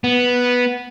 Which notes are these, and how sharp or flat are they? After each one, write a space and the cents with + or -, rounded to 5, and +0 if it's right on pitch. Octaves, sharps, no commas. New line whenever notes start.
B3 -5